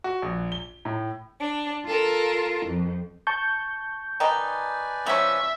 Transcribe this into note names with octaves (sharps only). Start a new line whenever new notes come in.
F#4
A#1
G7
A2
D4
F4 A4 A#4
F2
A5 C#6 G6
D#3 D#4 B4 D5 G#5
F3 F#3 C#4 E5